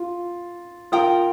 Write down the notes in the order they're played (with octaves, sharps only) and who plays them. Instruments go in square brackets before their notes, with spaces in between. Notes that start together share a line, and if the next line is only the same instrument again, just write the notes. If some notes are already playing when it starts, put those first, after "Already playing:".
Already playing: [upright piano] F4
[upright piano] F4 [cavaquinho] A#4 G5 D#6